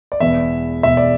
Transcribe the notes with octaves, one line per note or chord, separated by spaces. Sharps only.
D5
E1 E2 B2 E5
E1 E2 B2 E5
D5